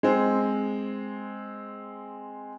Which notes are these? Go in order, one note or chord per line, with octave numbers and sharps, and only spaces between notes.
G#3 C4